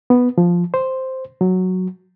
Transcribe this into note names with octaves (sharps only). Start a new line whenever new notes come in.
B3
F3
C5
F#3